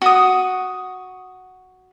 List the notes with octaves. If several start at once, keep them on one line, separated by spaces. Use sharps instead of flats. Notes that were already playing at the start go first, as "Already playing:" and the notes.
F#4 D#6